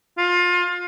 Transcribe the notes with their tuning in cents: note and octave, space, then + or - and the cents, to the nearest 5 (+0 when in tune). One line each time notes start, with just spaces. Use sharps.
F4 +25